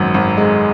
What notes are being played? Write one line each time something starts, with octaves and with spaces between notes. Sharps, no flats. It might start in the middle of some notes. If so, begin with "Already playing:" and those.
Already playing: G#1 F#2
G#1
G#3